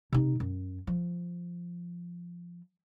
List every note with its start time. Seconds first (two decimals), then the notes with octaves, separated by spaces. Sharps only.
0.12 C3 D#4
0.40 F#2
0.87 F3